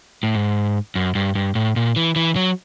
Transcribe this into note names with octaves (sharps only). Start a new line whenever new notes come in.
A2
G#2
F#2
G2
G2
A2
A#2
E3
E3
F#3